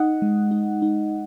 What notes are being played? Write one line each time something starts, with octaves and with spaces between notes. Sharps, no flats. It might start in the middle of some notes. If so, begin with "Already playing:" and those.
Already playing: D#4 D#5 F#5
G#3
D#4
D#4